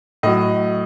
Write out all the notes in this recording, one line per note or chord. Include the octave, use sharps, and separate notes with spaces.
A2 F#3 D#5